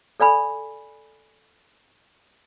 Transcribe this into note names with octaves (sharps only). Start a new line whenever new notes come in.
A4 D5 G#5 B5